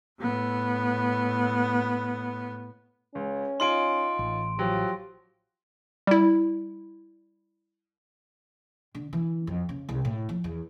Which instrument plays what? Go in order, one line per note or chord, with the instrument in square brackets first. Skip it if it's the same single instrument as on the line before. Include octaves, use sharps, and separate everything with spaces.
[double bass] A2 B3
[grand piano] C#2 [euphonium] C#4
[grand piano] D#4 F4 G#5 [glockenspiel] C6 D7
[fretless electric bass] A1
[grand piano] F3 F#3 [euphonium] G4
[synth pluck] G3 E4
[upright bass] D3
E3
F2
C#3
C2
A2
F3
E2